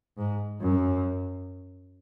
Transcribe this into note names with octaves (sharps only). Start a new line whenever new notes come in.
G#2
F#2